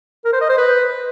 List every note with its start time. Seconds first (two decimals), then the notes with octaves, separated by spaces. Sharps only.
0.25 A#4
0.33 C5
0.41 D#5
0.49 C5
0.57 B4